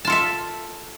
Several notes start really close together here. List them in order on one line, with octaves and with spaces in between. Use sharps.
A5 F4 A4 E5